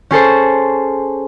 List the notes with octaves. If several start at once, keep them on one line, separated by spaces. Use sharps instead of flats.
C#4 G#4 A4 C5